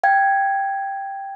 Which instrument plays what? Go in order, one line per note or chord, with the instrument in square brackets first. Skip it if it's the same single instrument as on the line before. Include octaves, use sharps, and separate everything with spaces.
[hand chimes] F5 G5 G#6